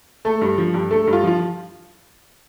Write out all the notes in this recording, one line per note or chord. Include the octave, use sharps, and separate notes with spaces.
A3 A4
G2
F3
G2
A3 A4
G2
F4
F3 F4